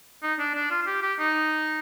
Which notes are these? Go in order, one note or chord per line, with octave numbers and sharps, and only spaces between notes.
D#4
D4
D4
F4
F4
G4
G4
D#4